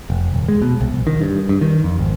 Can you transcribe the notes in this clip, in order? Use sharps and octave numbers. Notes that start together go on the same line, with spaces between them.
F1
D#1
G#3
B2
C2
A#1
D#3
G2
G2
D#3
F2
G#1